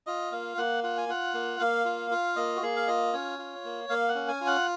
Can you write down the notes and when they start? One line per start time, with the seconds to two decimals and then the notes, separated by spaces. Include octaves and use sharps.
0.07 F4 D#5
0.32 A#3 F5
0.57 A#3 F#5
0.83 F4 F#5
0.97 G#5
1.09 F4 F#5
1.34 A#3
1.60 A#3 F5
1.85 F4
2.11 F4
2.36 A#3 D#5
2.56 F#4
2.62 A#3 G#4
2.76 F5
2.87 F4 D#5
3.13 C#4 C#5
3.39 F4
3.65 A#3
3.89 A#3 F5
4.08 F#5
4.15 C#4
4.28 G#5
4.41 F4
4.47 F#5